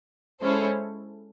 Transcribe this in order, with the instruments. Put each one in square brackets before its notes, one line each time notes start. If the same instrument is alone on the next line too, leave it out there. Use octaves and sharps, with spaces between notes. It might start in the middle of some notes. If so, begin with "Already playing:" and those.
[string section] G#3 C#4 E4 A4 C5